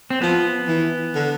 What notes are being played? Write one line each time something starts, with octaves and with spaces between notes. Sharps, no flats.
C4
F3 B3
E3
D3